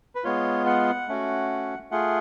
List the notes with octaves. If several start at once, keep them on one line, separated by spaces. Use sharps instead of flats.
B4
G#3 B3 F4 C#5
F#5
A3 C#4 F#4
A3 F4 G#4 F#5